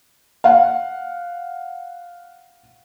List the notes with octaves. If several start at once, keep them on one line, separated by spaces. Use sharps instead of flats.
F5 F#5